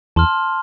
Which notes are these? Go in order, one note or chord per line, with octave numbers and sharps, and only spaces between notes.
E2 A5 C6 F6